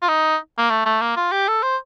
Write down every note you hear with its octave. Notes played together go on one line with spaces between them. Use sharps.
F4
D#4
A#3
A3
A3
A#3
F4
G4
A4
C5